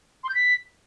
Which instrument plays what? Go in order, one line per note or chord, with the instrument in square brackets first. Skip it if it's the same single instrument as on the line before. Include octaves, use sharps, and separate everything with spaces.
[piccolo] C6
G6
B6